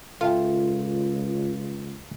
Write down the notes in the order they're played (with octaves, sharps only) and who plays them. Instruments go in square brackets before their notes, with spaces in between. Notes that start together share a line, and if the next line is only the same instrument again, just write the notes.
[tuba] C#2 [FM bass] F4 [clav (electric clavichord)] A4 E5 G5